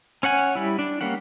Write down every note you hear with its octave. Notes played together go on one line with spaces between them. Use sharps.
C#4 C#5 F#5 G#5
G3 E4
D4
G3 A#3 C#4 F#5